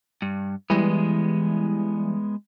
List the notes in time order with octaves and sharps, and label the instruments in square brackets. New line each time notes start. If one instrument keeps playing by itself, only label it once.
[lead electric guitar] G2
[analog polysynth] E3 G3 [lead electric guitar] G#3 B3